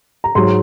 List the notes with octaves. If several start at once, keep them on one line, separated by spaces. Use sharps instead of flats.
A#5
G#2 F#3 C6